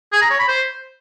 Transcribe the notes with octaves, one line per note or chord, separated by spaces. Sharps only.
G#4
A#5
C#5
B5
C5